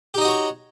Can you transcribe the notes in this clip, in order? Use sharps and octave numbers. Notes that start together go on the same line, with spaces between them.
D#4 F#4 G4 C#5 D#5